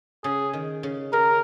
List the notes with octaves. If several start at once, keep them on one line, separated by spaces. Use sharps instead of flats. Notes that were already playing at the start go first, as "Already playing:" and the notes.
C#3 G#4
D#3
C#3
C#3 A#4